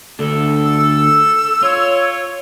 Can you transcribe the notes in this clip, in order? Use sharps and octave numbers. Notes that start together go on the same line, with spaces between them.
D2 D4 A4
E6
F4 C#5